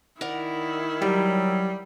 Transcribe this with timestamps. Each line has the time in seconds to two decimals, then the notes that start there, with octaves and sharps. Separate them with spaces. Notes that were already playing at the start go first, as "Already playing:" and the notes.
0.21 D#3 E4 A#4 D5 F#5
1.02 F#3 G3 G4